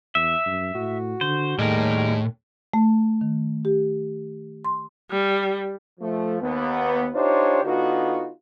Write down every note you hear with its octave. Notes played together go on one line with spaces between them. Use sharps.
E2 E5
F#2
A2 F#4
D3 C5
D#2 A2 G3 G#3 A#4
A3
D#3
G4
C6
G3
F3 A3
D#2 B3
D4 D#4 F4 G4 C5 C#5
D3 B3 D#4 F4 F#4